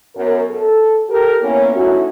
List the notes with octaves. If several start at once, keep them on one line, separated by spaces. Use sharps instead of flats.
F#2 B3 A#4
A4
G4 A4 A#4
A#3 B3 C#4 E4 C#5
A3 C#4 D#4 E4 F#4